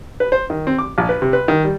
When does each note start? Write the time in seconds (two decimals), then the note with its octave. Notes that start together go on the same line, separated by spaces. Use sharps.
0.20 B4
0.32 C5
0.50 D#3
0.67 C4
0.78 D6
0.98 A#1
1.09 B4
1.22 C3
1.33 B4
1.48 D#3
1.64 G3